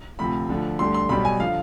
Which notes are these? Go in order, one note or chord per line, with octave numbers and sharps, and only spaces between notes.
D2 C3 F3 B5
D2 D3 F3
D2 D3 G3 C6
C6
B1 B2 G3 B5
G#5
D3 F3 F5